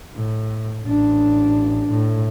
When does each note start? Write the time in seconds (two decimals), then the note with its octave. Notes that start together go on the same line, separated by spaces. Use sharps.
0.16 A2
0.86 A1 D4
1.90 A2